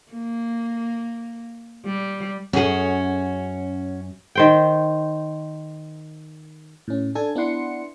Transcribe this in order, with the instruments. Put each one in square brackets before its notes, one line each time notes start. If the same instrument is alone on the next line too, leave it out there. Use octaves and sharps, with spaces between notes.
[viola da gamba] A#3
G3
[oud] F#2 G#4 [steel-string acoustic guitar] C#4 F#4
[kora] D#3 C5 G5
[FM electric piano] A2 C#4
D4 A4 G#5 G#6
B3 D4 E4 F#5 C6 C#7